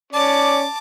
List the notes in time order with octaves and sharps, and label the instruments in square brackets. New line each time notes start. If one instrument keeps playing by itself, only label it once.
[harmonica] C#4 D5 [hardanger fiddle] A5 D6